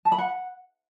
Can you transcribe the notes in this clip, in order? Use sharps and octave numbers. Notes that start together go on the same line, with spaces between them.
A5
B5
F#5